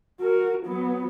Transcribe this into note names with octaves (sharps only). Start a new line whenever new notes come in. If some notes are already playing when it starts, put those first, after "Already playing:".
F#4 A#4
F#3 B3